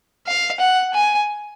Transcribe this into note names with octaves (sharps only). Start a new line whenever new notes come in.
F5
F#5
G#5